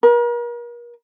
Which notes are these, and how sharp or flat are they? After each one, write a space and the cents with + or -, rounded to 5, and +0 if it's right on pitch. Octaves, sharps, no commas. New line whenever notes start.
A#4 +40